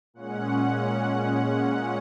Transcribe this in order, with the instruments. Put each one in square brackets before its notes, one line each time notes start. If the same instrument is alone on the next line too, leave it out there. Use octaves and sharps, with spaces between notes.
[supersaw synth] A#2 G#3 C#4 F#5